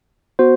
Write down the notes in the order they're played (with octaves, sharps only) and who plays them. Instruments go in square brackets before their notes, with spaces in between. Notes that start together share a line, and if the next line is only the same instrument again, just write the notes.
[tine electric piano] B3 F#4 C5